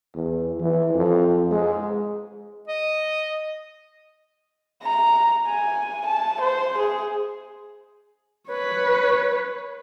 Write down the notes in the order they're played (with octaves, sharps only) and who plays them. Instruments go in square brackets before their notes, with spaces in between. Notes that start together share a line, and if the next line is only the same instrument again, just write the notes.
[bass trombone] E2
E3
F2
G#3
[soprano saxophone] D#5
[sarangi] A#5
G#5
A5
C5
G#4
[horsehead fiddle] B4 C#5